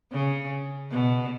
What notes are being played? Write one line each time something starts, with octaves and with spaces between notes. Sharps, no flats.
C#3
B2